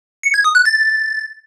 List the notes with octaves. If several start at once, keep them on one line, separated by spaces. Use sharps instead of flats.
C#7
G#6
D#6
F#6
A6